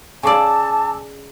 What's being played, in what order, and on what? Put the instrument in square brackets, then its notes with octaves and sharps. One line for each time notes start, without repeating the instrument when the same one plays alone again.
[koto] C#3 D5 [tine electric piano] G#5 D6 E6 [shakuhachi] A5